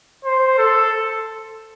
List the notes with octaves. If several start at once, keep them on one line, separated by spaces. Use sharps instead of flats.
C5
A4